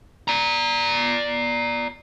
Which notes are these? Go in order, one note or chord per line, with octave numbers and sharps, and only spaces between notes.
D5 A#5